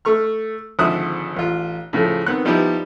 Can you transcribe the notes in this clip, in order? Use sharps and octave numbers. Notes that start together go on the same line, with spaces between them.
A3 C#6 F6
G#1 D3 F3 E5 D#6 F#6
A1 F4
A2 C#3 F3 A3
D#3 B3 C4 F#5 F#6
F3 G3 B3 D#4 E4 G4